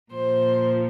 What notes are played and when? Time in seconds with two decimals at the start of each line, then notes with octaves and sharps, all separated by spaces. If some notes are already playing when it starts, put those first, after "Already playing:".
0.12 A#2 F3 C5